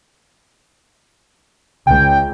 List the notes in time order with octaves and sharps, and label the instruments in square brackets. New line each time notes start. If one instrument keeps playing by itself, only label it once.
[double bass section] C#2 [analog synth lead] G5